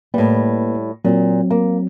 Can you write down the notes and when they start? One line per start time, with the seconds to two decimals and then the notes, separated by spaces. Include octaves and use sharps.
0.14 A2 G3 A#3 B4
1.05 A#2 F#3 C4
1.51 A#3